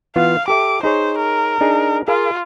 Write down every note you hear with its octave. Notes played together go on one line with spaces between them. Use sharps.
E3 B3 F4 F5
G4 A4 E5 D6
D#4 G#4 C5 C#5
A#4
D4 D#4 G#4
F4 G#4 A#4 F5